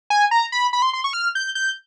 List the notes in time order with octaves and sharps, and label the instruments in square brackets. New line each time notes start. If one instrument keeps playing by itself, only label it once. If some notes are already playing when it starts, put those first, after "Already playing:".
[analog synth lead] G#5
A#5
B5
B5
C6
C6
C#6
F6
G6
G6